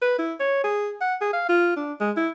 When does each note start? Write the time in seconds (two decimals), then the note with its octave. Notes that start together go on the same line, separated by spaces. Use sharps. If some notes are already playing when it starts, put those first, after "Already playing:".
0.02 B4
0.19 E4
0.40 C#5
0.64 G#4
1.01 F#5
1.21 G#4
1.34 F5
1.49 F4
1.77 D4
2.01 G#3
2.17 E4